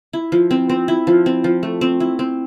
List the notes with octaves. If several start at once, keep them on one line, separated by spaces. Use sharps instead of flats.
E4
F3
C4
C4
E4
F3
C4
F3
A3
C4
E4
C4